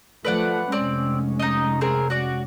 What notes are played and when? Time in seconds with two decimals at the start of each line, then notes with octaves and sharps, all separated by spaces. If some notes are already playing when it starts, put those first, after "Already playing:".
0.25 F3 A3 B4 D5 F#5
0.72 F1 G#3 C4 C#4 D5
1.39 D#4 D#5
1.81 C4 G#4 A#4
2.10 F#4 D5